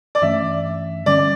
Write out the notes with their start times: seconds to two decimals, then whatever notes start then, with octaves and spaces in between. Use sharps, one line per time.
0.15 D5
0.22 G2 E3 A3 C#4 E5
1.06 D3 G3 C#4 D5